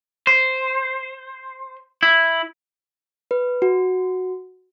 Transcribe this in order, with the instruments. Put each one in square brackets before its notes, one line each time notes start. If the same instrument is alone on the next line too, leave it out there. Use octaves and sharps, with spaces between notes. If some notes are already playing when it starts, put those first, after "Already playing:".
[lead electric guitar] C5
E4
[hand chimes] B4
F#4